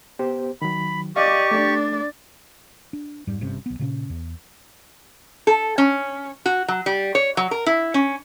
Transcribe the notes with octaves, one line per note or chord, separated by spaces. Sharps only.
B3 G4 C5
D#3 F#3 B5
G4 D5 D#5 F5 C#6
A3 D4 D5
D4
F2 G#2 G3
G#1 G2 C3 C#4
B1 B3
A#2 C#3 C4 C#4
E2
A4
C#4
F#4
F#3
G3
C#5
F#3
A#4
E4
C#4